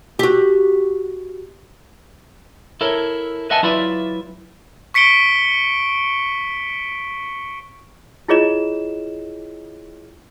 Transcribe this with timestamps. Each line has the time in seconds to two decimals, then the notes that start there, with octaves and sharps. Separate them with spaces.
0.19 F#4 G4
2.81 E4 A4 A#4 C#5
3.50 B4 D#5 E5 F#5 G#5 A5
3.63 F#3 E4 F4 B4 D5 E5
4.94 C#6 B6 C#7 D7 G7
8.28 E4 F4 G#4 C#5 D#5 E7